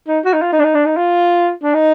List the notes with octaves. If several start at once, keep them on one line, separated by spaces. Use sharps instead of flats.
D#4
F#4
D#4
F4
D#4
D4
D#4
D4
D#4
F4
D4
D#4